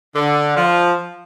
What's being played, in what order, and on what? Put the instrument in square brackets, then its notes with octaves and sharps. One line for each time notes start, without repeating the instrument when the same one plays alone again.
[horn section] D3
F3